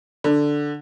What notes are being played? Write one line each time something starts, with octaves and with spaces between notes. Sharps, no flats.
D3